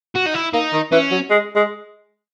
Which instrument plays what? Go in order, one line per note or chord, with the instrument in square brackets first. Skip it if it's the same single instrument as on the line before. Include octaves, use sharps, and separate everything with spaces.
[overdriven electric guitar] F#4
D#4
E4
[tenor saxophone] A#3 [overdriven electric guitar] D#4
[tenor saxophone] D#3
[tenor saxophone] E3 [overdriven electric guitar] C#4
[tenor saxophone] F#3
G#3
G#3